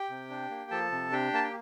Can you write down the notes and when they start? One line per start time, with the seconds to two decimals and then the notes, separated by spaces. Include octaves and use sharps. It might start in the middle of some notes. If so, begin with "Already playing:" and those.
Already playing: G4 G5
0.10 C3
0.30 D4
0.50 A#3
0.71 F3 A4 A5
0.92 C3
1.12 D4 G4 G5
1.33 A#3 A5
1.44 G5